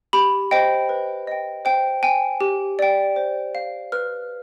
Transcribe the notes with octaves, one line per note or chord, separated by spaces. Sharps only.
G4 B5
C5 D#5 G5
B4
D#5 G5
C5 G5
G5 G#5
G4
D5 G5
C5
F5
B4 F6